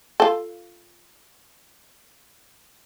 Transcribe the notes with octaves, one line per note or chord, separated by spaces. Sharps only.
F4 A4